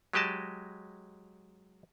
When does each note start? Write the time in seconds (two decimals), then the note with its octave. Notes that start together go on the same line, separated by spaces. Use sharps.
0.13 F#3 G#3 G4 D#5 A5